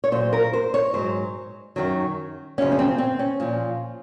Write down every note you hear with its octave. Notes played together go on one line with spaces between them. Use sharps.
C#5
A#2 F#3 C5
A#4
C5
C#5
G#2 F#3 C5
F#2 D#3 F#3
F#2 C#3 F3 C#4
C#4
C4
C4
C#4
A#2 F3